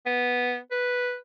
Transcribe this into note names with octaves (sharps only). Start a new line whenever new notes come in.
B3
B4